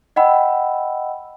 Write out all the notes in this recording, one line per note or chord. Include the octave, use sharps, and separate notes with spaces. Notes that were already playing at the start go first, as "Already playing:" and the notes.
D#5 F#5 G5 B5 E6